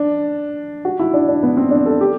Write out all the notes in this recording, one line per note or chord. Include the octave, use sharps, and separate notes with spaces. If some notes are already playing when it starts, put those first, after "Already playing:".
Already playing: D4
F#4
E4
D4
D4
B3
C4
D4
A4
G4